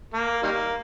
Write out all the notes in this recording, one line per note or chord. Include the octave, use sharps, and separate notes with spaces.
A#3
D#3 G3 A#3